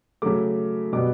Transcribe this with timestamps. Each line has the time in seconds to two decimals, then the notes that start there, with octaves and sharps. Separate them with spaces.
0.22 C#3 F#3 A3 D6
0.93 B2 G3 B3 D6